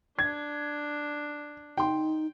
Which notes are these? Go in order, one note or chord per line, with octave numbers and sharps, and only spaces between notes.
D4 G#6
D#4 G5 C6